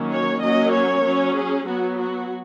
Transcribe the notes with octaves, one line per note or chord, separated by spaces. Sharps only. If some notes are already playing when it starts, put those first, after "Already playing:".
Already playing: D#3 F#3 A#3 C#4
C#5
F#3 A#3 C#4 D#5
C#5
F#3 C#4
G#4
F#3 B3 F#4
F#4